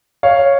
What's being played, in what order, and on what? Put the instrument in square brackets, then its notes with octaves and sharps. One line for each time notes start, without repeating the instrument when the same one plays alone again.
[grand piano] C#5 F5